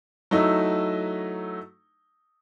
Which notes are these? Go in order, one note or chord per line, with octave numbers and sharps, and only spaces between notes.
F#3 A3 D#4 E4